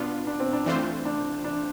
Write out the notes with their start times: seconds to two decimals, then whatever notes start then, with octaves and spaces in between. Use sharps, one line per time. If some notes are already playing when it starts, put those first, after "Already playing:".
Already playing: B2 B3 D4 F4
0.27 D4
0.40 C4
0.53 D4
0.66 E3 A3 C4 D4 F4 C5
1.05 D4
1.44 D4